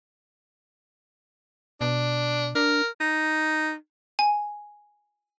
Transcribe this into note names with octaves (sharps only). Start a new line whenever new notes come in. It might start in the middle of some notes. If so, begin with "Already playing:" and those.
B2 D4
D4 A#4
D#4
G#5